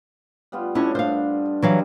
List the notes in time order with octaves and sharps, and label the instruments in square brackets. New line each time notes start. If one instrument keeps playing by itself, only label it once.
[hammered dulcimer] G3 B3 F4
[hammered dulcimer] A2 D4 [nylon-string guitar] C#4 E4
[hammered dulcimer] G2 [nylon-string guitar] C5 F5
[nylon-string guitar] E3 F#3 F5 [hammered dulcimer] G3